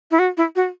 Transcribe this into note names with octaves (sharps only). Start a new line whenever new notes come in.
E4
F#4
E4
F#4